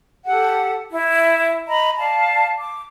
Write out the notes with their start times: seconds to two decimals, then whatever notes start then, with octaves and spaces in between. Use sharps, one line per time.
0.26 G4 A4 F#5
0.90 E4
1.68 D#5 A#5 B5
1.98 D5 F5 A5
2.58 D6